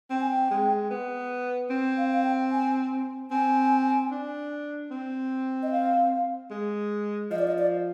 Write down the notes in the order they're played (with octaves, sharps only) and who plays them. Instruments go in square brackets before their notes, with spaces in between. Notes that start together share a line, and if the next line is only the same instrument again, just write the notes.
[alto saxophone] C4 [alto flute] G5
[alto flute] G#5
G5
[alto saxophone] G#3
B3
C4
[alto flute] F5
F5
G5
G#5
[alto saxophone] C4 [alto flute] G#5
[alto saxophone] D4
C4
[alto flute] D#5
F5
[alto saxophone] G#3
[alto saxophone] F3 [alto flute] D#5
[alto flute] D5
D#5
D5